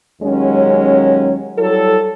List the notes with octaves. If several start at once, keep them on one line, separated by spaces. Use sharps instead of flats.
D#2 F#3 G#3 C#4
F#3 G3 E4 A4